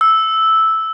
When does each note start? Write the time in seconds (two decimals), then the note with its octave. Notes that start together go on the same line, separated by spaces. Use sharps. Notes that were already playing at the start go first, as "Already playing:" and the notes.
0.01 E6